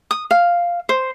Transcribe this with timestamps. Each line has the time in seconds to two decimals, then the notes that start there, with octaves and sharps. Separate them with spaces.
0.11 D#6
0.31 F5
0.89 C5